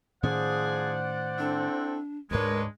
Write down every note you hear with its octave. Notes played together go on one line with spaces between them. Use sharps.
A2 D#3 F3 C#4 G#4 C5 D5 F#5
C4 D4 E4 A4
D2 G#2 G#3 D4 A#4 B4 C#5